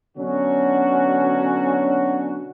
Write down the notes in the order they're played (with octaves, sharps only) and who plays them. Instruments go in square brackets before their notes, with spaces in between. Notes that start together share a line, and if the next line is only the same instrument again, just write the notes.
[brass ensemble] B2 D3 F#3 C#4 D4 F#4